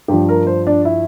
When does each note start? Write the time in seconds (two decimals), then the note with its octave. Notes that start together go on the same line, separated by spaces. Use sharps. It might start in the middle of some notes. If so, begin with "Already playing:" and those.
0.08 G2 F3 G4
0.29 A#4
0.47 C5
0.67 D4
0.85 E4